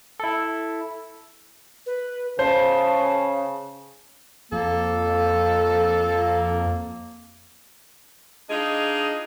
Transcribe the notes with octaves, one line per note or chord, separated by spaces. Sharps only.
E4 A4
B4
C#3 C5 A5
F2 A#3 A4
D4 D#4 F4 G#4 D#5